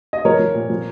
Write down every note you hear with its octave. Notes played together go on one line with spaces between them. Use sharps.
D#5
F3 A#4 C#5
F3
A#2
F3